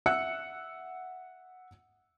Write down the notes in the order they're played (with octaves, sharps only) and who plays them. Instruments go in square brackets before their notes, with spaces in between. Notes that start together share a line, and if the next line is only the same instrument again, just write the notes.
[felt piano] E5 F#5 E6 F#6 C#7